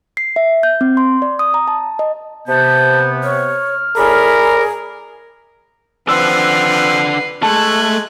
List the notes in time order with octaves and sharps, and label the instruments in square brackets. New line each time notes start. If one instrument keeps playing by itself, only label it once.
[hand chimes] C7
E5
G6
C4
C6
D5
D#6
A#5
A5
D#5
[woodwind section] C3 B3 [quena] A5 [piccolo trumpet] G6
[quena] C#5 [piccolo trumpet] F6
[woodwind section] A2 D5 B5 [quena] G#4 [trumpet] A#4
[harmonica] F3 C4 [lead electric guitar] D4 F#5 [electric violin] B4 C7 [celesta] E6
[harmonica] G#3 [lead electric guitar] A3 [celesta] A5 [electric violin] F#6 G#6